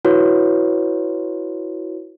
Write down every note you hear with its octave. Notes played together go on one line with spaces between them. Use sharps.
E4 F#4 B4 C#5